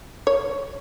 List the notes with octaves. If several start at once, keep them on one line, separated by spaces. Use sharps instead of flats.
C#5